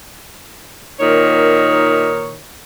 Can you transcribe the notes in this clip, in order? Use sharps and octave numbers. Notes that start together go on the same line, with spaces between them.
A#2 D#3 D#4 A#4 C#5